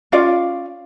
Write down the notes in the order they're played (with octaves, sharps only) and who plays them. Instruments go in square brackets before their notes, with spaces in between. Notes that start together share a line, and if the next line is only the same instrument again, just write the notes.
[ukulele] C#4 F4 D5 F5